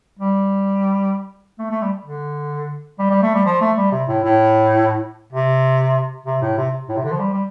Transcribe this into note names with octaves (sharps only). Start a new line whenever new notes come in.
G3
A3
A3
G3
D3
G3
G3
A3
G3
F3
A3
G3
C3
A2
A2
C3
C3
A2
C3
A2
C3
D3
F3
G3
G3